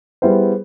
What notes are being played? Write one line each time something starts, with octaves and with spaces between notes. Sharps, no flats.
G3 B3 E4 G#4 C5